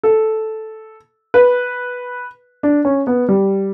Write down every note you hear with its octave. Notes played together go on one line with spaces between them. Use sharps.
A4
B4
D4
C#4
B3
G3